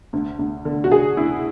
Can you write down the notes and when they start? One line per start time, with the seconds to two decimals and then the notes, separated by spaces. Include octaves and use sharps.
0.13 D2
0.39 D2
0.65 D3
0.84 F#4
0.91 D3 G#4
1.17 D2 E4